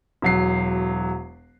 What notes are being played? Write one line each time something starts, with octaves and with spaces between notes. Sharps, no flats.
E1 F#3 C7